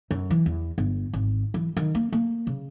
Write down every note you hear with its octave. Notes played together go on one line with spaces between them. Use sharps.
F#2
E3
E2
G1
G#1
E3
D#3
A#3
A#3
C#3